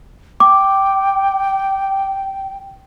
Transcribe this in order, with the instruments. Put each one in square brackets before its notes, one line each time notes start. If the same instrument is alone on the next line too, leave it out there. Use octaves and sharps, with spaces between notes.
[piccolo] G5 [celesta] D6